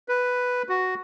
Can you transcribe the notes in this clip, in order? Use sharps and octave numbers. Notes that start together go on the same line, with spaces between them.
B4
F#4